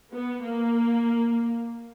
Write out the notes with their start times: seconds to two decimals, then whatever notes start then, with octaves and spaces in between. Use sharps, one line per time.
0.14 B3
0.43 A#3